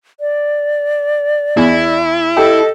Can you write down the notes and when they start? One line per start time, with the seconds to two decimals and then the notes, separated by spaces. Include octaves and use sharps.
0.20 D5
1.57 E2 E4
2.37 G4 A4 D#5